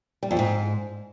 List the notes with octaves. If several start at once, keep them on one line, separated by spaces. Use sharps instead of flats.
G3
F2
G#2